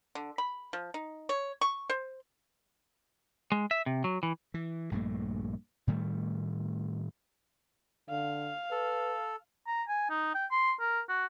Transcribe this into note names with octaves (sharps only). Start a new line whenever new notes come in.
D3
B5
F3
D#4
C#5
C#6
C5
G#3
E5
C3
F#3
E3
E3
A#1 G2 A3 A#3
A2 D#3 G3 A3
D3 F5
A4 B4
A#5
G#5
D#4
G5
C6
A#4
F#4